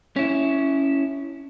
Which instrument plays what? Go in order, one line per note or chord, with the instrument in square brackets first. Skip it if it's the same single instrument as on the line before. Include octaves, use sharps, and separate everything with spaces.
[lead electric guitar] C#4 E4